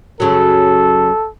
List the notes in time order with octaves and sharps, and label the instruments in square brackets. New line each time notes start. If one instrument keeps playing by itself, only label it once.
[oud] F#2 C#3 F#3 [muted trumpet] A4